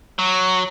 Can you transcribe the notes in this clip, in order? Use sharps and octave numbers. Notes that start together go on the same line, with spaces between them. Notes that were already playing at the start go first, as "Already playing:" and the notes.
F#3